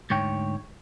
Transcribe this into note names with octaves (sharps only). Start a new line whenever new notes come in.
D2 G#2 C#5 G5